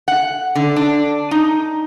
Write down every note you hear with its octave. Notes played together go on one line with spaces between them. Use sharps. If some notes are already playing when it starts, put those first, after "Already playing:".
F#5
D3
D4
D#4